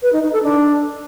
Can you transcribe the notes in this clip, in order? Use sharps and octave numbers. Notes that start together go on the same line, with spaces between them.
B4
D#4
D#4
A4
D4